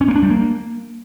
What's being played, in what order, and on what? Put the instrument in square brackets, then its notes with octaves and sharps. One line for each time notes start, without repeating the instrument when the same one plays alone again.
[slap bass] C#4
A#3
D4
G3
A#3